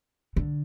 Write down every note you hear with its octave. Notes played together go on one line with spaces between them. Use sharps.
D3